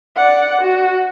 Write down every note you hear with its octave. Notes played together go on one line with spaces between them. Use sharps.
D5 F#5
F#4